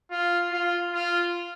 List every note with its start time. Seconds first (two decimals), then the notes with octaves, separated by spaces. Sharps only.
0.11 F4
0.52 F4
0.93 F4